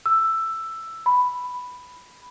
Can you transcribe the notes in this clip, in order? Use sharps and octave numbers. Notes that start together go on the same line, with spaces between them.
E6
B5